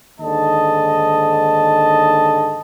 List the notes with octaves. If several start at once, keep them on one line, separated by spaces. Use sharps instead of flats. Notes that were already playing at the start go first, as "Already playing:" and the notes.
D#2 G#2 D3 D#5 A5